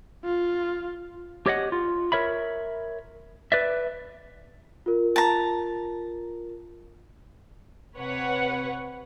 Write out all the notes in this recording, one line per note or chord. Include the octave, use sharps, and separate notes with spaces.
F4
G4 C#5 D#5 F#5
F4
A#4 C#5 E5 B5
B4 D5 E5
F4 A#4
A5 A#5
C3 B4 C#5 F#5